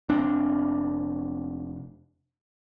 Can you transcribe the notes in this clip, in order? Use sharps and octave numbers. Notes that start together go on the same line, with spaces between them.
F1 C4 D4